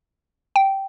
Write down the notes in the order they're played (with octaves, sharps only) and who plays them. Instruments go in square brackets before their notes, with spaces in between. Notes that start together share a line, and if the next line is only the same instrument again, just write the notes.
[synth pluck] G5